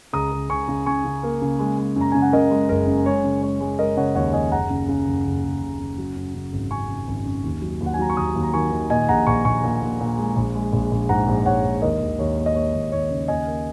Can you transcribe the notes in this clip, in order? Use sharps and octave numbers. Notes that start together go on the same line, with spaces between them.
C#2 A#5 D#6
C#2
C#2 G#5 C#6
C#3
C#3 G#5 C#6
C#3
A#3
C#3
G#3
G#3
F#2
A#5
C#3 G#5
F#5
C#3 A#4 D#5
G#3
F#1 A#4
F#2
G#3 C#5
C#3
G#3 C#5
G#3
G#3 A#4 D#5
C#3 C#5 F#5
D#2 C#5 F#5
D#2 D#5 G#5
F#1 F#5 A#5
C#3
C#3
F#1
F#1
F#1
F#1
C#3
F#3
F#2
C#3
G#1
C#3 G#5 C#6
C#3
G#1
F#2
D#2
F#3
D#2
F#5
G#5
F#3 A#5
C#6
D#2 A#5 D#6
D#2
A#5
D#3 G#5 C#6
D#3
A#2 D#5 G#5
A#1 F#5 A#5
A#1 G#5 C#6
A#1 G#5 C#6
A#2
A#2
A#2
G#3
A#1
G#3
A#1
A#1
G#2 F#5 A#5
A#1
G#2 C#5 F#5
G#2
D#2 A#4 D#5
D#2
D#2 C#5
A#3
D#5
A#3 C#5
D#2
D#2 C#5
C#3
D#2 D#5 G#5
A#3